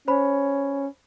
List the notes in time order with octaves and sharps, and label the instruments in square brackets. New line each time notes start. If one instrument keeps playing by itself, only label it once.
[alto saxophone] C#4 [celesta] C5 B5